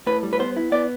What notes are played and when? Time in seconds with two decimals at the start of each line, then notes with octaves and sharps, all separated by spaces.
0.06 A2 B4
0.23 G3
0.33 B4
0.39 B3 C5
0.56 E4
0.72 B3 D5